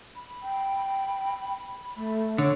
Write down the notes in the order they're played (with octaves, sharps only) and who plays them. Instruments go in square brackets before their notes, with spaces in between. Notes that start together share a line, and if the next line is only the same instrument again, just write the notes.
[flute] B5
[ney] G5
A3
[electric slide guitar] D3 [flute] C#5